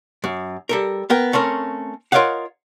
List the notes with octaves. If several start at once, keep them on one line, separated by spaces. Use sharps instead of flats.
F#2
G3 A4 A#4
B3 A#4 G5
A3 C4 C#4 A#4
F4 A#4 C#5 D#5 F5 F#5